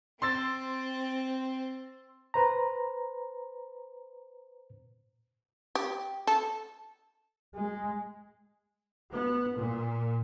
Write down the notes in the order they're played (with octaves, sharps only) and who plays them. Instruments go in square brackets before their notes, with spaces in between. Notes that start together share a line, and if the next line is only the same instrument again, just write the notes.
[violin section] C4 [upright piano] C6 E6 A6
[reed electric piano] B4 C5 A#5
[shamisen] G4
A4
[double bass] G#3
[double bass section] B3
A#2